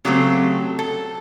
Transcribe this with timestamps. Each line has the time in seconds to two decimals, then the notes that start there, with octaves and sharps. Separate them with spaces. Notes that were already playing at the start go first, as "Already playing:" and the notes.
0.05 C#3 F#3 A3 C4 G4
0.79 A4